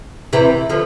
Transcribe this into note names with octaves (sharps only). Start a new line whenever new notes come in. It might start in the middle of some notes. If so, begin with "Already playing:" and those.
C3 E3
D3 F3